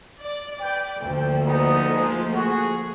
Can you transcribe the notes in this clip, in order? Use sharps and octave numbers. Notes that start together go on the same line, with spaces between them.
D5
B4 D5 G5
D2 F3 A3 A#3 G5
B3 D#4
G#3
F#4 G#4